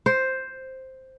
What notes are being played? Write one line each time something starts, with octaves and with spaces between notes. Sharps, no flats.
C5